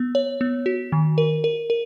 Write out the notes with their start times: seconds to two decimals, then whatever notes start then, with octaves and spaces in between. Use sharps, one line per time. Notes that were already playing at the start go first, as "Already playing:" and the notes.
Already playing: B3
0.15 C#5
0.41 B3
0.66 F#4
0.92 D#3
1.18 A#4
1.44 A#4
1.70 A#4